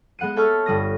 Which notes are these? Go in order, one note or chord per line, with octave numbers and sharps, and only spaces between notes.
G#3 B3 F#5 C#7 D#7
A4 C#5 E5 A5 C#6 F6
G1 G3 D#6 A#6